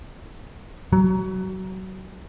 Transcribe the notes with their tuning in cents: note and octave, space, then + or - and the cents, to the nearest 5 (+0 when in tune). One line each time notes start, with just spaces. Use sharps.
F#3 +25